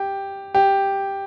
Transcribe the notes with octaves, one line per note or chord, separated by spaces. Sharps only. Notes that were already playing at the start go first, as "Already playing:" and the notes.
Already playing: G4
G4